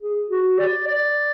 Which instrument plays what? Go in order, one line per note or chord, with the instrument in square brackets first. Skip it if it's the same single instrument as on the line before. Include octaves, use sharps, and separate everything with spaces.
[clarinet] G#4
F#4
D5
D5